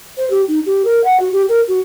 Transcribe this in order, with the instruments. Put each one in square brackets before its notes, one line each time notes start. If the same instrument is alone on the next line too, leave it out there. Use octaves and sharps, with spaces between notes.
[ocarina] C5
G4
D#4
G4
A#4
F#5
F#4
G4
A#4
F#4